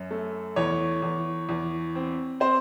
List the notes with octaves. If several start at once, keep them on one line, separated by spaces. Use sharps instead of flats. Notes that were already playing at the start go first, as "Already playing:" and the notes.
Already playing: F#2
A3
E2 C#5
E2
E2
C4
C4 C5